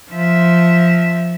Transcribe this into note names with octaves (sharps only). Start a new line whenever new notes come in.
F3 E5